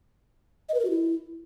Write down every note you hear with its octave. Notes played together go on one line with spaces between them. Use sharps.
D#5
B4
A#4
F#4
E4